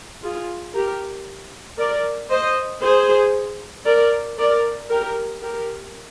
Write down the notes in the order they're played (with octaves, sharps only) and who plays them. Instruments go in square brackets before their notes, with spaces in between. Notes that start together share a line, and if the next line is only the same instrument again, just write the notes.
[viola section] F4 G#4
G4 A#4
A#4 D5
C5 D#5
G#4 C5
A#4 D5
A#4 D5
G4 A#4
G4 A#4